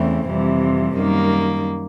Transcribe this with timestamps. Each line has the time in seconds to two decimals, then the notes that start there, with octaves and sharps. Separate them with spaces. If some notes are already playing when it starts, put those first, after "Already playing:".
Already playing: E2 C#3 E3 A3 C4
0.27 F2 C3 E3 G3
0.95 F#2 D#3 G3 A#3